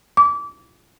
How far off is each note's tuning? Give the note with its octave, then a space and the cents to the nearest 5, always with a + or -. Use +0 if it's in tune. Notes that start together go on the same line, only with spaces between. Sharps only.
D6 -25